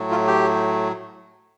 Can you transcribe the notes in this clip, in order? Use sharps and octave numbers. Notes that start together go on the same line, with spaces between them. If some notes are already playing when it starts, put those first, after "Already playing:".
Already playing: A2 F#3 A3
F4
G4